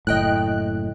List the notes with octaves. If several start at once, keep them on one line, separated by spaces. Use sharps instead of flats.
F#1 A2 D#5 G5 F#6